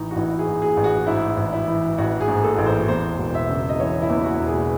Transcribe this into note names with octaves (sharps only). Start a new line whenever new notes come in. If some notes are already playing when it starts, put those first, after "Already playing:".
Already playing: A1 A2 E3 D#4
F#4
A1 E4
G#4
A2
G#4
A1
F#4
G#2 E4
A1
E4
E3
A1 F#4
G#4
G#2
A4
A1
C5
E2 C5
E1
E5
C#3
D#5
E3 C#5
E4
E2
F#4
E1
G#4